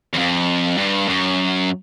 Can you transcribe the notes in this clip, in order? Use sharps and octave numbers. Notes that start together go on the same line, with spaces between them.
E2
F2
G2
F#2